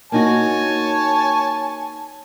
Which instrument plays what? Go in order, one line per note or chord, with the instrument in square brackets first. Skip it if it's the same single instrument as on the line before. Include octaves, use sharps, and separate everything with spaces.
[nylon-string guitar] A#3 D#4 F#4 [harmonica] C#5 G#5 A5